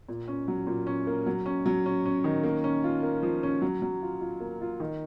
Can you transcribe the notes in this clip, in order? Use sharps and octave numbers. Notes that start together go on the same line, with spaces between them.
A#2
C#4
F#3
A#2
C#4
A#3
F#3
C#4
F#3
C#4
C#4
D#3
A#3
C#4
F4
A#3
F3
C#4
F#3
F#3
F4
F4
A#3
F4
D#3